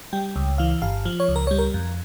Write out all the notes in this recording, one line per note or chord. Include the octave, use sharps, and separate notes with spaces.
G3 G5
C#2
E3 F5
G1 F5
F3
C#5
C#2
A#4
G3 C#5
A#4
F2